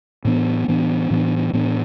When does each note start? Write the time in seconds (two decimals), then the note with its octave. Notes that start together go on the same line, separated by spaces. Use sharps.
0.25 A2 E3 B3 D4
0.68 A2 E3 B3 D4
1.10 A2 E3 B3 D4
1.53 A2 E3 B3 D4